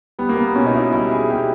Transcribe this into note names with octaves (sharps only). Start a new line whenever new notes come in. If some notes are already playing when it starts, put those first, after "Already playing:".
G3 B3
A#3
B3
B2 C#4
D#4
E4
G3 E4
G#4
B2 G4